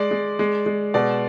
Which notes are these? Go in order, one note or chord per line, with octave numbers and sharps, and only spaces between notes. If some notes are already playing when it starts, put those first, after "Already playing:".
Already playing: G#3 D5
G#3
G#3
G#3
B2 D5